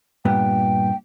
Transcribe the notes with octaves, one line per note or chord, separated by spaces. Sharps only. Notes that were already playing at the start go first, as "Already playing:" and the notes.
G2 A#2 B3 G5